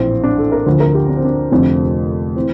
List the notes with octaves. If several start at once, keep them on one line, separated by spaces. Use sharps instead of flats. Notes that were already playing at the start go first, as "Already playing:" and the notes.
Already playing: A#1 A2 E3 C4
D4
A4
A#4
D2 D3 F3 C5
A#4
G4
D4
C4
D4
F1 F2 D3 F3 C4
E3 C4